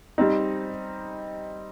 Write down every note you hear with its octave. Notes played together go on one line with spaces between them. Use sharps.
G3 C4 D#4